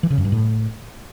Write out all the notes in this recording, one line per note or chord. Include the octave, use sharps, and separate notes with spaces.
E3
C#3
F#2
G2
A2